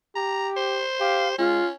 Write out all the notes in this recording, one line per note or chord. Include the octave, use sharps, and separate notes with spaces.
G4 A#5
C5
G4 F5
G#3 C#4 F4